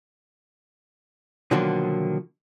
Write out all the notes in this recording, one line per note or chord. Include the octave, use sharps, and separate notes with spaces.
B2 D3 D#3 F3 F#3 A#3